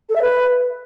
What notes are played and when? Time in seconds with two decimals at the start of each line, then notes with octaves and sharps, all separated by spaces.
0.09 A4
0.15 E5
0.21 B4